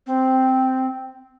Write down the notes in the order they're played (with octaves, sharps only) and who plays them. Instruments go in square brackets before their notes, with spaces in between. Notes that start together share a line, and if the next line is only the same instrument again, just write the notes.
[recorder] C4